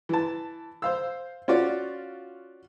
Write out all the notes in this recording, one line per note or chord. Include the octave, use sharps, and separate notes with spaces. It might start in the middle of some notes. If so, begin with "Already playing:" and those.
E3 A5
C5 F5 E6
C#4 F4 F#4 D5